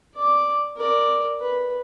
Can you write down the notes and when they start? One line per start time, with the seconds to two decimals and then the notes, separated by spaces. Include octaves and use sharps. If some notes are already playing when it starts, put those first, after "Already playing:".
0.14 D5 D6
0.76 A#4 D5
1.40 B4